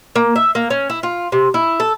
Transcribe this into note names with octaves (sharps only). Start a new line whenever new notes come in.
A#3
E5
A#3
C#4
E4
F4
C3
E4
A4